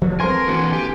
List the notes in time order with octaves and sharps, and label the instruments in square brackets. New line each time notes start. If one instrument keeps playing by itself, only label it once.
[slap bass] F3 [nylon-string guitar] G3
[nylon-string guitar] B3 C4 A4 [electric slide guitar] A#4 [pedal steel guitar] G#5 C6
[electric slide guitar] E3 F#4 [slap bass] A#3 D4
[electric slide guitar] G4 [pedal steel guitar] G#5